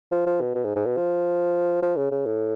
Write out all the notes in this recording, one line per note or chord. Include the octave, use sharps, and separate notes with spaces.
F3
F3
B2
B2
G#2
G#2
B2
F3
F3
C#3
C#3
A2